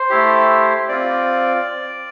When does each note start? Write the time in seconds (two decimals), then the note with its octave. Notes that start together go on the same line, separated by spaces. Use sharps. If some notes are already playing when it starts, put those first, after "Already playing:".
Already playing: C5
0.10 A3 E4 G4
0.89 C4 F4 D5